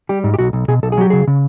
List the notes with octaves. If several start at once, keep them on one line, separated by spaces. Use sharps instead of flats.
G3 G4
G#2
G4
B1 F#4
B1
B2 G#4
B1 A4
G#4
F#3 G4
C#3 G#4
C#3